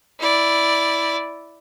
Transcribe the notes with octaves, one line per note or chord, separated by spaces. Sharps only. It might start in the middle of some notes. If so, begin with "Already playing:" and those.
E4 D5